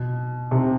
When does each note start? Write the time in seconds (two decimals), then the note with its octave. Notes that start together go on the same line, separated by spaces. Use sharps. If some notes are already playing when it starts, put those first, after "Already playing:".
Already playing: B2
0.51 C3